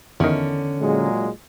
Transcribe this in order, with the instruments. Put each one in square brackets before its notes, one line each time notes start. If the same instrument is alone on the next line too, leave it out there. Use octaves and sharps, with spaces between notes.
[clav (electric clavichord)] E2 D#3 [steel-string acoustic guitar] D3 C#4
[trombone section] A#2 F#3 G#3